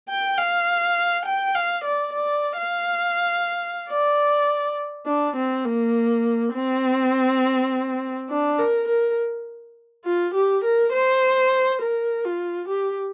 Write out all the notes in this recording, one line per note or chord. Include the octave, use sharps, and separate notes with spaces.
G5
F5
G5
F5
D5
D5
F5
D5
D4
C4
A#3
C4
D4
A#4
A#4
F4
G4
A#4
C5
A#4
F4
G4